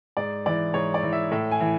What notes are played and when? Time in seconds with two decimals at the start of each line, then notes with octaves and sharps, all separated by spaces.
0.17 G#2 D5
0.46 E3 D5
0.74 G#2 C#5
0.94 D5
1.03 E3
1.12 E5
1.31 A2 E5
1.51 G#5
1.60 E3